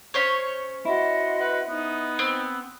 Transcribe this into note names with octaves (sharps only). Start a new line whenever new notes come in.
C#4 C5 C#5
E4 F#4 D#5 C6
B4
B3 D#4
C4